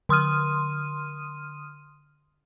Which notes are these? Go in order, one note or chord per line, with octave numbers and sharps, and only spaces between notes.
D3 C6 D#6 F6 D#7